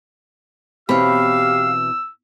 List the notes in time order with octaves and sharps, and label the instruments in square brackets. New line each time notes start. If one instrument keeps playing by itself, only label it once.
[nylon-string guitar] B2 E3 C4 [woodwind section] G4 F5 [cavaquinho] C#5 B5 [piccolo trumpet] E6